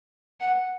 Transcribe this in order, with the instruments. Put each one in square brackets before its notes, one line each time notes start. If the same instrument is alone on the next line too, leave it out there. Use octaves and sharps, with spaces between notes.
[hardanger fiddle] F#5